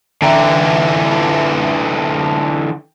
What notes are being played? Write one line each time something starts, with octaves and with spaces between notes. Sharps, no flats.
D3 E3 E5 G5 A#5